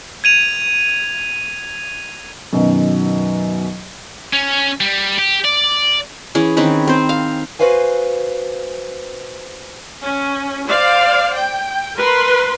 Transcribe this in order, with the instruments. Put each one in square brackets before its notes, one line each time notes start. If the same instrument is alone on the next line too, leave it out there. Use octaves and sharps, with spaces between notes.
[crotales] G#6 D#7 F7
[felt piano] F#2 B2 D#3
[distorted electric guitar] C#4
G3
G4
D5
[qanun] E3 C#4 G#4
D#3 C4 C#4 B4
C4 C5
F5
[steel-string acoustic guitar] F#4 G4 B4 C5 F5 G#5
[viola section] C#4
C5 D5 F5
G5
A#4 B4 C6